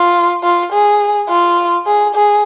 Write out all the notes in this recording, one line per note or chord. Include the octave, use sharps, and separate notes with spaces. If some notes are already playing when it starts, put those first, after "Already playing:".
Already playing: F4
F4
G#4
F4
G#4
G#4